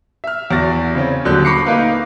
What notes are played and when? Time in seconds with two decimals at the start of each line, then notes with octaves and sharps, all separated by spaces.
0.24 E5 F6
0.51 E2 F#4 A6 A#6
0.95 C#3 C4 C#4
1.25 D#1 D3 F#3 F#6 G6
1.45 B5 C#6 D6 A#6 C7 C#7
1.66 A3 A#3 D#4 A#4 B4 F5